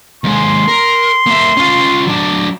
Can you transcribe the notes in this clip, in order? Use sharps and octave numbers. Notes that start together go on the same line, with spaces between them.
D#2 G#3 C6
A#4
A#3 E5
C#4 F4
F#3 D4